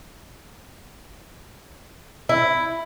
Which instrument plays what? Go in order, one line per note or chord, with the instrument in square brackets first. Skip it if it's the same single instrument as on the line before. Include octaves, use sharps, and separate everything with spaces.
[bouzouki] E4